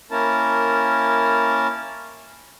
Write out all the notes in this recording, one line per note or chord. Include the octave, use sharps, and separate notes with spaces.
A#3 C#4 E4 A#4 A5